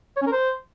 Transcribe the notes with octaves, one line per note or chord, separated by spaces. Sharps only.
C#5
C#4
A#4
C5